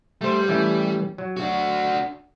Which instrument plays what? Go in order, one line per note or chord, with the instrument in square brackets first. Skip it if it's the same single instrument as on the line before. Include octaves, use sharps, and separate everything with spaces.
[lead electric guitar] G3 [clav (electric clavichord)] A3 C5
[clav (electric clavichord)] E3 A3 C#4
F#3
[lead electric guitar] D4 F#4